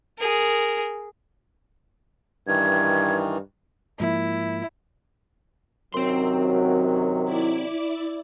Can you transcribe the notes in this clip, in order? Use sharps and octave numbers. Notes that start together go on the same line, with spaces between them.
G#4 A#4
G2 D#3 E3 G#6
G#2 F3 A#3 E4
F#2 C3 D#3 F#3 C4 C6
E4 D5